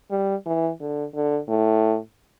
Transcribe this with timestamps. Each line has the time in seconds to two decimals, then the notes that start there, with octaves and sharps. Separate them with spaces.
0.11 G3
0.46 E3
0.80 D3
1.15 D3
1.48 A2